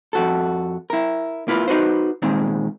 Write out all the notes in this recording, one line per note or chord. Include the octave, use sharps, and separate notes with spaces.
F2 F#4 A4
E4 A#4
A#3 E4 F4 B4
D#4 F#4 B4 C5
A#2 D#3 G#3 C4